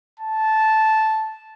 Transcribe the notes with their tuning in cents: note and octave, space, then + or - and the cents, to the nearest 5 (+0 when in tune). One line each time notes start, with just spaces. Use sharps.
A5 -10